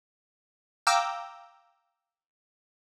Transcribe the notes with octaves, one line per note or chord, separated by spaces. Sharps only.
F5 G5 A#5 D6 E6